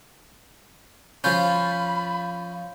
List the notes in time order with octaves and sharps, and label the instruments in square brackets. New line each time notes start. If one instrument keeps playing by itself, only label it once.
[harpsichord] F3 C#4 [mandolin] F4 F5 [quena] B5 [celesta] G6